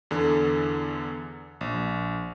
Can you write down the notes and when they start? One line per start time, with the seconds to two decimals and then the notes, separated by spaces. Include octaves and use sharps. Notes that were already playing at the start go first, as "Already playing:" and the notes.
0.11 E2 D3
1.61 A#1